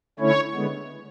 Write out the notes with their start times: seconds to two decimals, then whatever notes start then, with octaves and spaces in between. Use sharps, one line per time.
0.19 D3 A3 C#4 E4 C#5
0.54 D3 G#3 B3